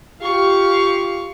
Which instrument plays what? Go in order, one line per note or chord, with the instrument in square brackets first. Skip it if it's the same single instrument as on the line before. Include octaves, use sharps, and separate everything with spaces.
[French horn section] F4 G4 [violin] F5 C#6